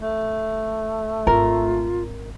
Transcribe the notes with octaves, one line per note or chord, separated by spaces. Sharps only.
A3
G#1 F4 A#4